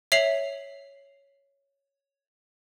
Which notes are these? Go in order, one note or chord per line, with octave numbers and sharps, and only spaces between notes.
C#5 E5 C7 F7 F#7